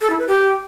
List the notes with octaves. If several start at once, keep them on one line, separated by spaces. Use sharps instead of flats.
A4
E4
B4
G4